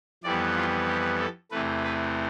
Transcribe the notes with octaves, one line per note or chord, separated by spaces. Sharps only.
F2 E3 G3 B3 D5
F4
G4
A4
E2 C3 E3 A3 B4
B4